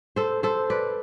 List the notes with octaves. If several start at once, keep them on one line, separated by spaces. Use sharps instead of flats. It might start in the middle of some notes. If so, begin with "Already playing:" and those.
A4 C5
A4 C5
B4 D5